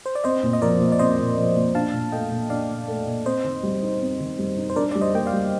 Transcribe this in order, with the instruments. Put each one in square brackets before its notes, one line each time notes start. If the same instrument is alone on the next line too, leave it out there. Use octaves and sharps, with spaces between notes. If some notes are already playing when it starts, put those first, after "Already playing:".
[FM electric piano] C5
D5
[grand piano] C4 [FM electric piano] C5 D#5
[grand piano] A#2
[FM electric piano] D#5
[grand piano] F3 [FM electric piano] A#4 D5
[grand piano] A#2
[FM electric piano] D5
[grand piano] C4 [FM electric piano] C5 D#5
[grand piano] A#2
F3
A#2
[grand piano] D4 [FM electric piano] F5 A5
[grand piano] A#2
[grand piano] A3 [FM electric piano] D#5 G5
[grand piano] A#2
[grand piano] D4 [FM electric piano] D5 F5
[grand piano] A#2
A3
A#2
[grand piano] C4 [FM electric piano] C5 D#5
[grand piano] D#3
G3
D#4
C4
D#3
G3
D#4
[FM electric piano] C5
[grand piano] D4 [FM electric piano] A#4 D5
[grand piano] G3 [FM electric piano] D5
[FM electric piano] C5 D#5
[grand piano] A#3 [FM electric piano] G5
[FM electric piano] D5 F5
[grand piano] G3